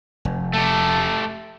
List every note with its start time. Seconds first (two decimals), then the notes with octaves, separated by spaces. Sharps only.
0.25 F1
0.53 A3 G4 A5